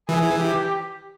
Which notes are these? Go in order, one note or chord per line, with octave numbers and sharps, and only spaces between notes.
E3 G#4
G4